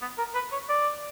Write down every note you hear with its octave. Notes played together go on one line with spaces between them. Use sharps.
B3
A#4
B4
C#5
D5